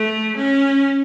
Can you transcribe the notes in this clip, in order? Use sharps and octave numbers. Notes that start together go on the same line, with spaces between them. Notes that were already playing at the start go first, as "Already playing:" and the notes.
Already playing: A3
C#4